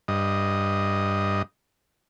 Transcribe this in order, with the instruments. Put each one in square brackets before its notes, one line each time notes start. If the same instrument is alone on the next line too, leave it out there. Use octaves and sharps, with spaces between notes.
[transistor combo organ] G2 D#5